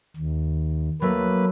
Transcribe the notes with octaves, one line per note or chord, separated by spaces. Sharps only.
D#2
F#3 A3 A#3 B4